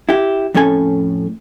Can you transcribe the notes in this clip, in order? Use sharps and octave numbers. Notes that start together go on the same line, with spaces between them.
E4 G4
F2 A2 C#4 A4 G#5